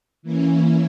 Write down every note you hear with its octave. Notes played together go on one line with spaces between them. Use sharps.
E3 A#3 C#4 E4